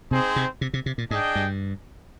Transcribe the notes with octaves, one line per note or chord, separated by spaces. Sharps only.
C3 C4 D#4 G#4 C5
C3
C3
C3
C3
A#2
G#2 D4 G#4 D#5 G5
G2